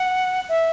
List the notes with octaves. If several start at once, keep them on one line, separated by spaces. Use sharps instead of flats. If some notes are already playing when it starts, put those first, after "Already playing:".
Already playing: F#5
E5